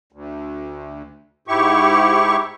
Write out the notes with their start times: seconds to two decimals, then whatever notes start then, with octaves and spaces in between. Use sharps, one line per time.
0.12 D2
1.48 G#2 E4 G4 C#6